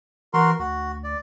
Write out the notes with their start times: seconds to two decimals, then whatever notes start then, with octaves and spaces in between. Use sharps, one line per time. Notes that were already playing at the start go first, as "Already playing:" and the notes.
0.34 E3 F#4 A#4 C6
0.59 D2 F#4
1.04 D5